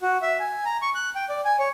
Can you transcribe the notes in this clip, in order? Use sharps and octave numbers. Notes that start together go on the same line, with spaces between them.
F#4
E5
G#5
A#5
C#6
F#6
G5
D5
G#5
C#5